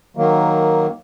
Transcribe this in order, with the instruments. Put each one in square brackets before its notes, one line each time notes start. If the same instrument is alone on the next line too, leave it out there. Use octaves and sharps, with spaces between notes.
[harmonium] D#3 F#3 A#3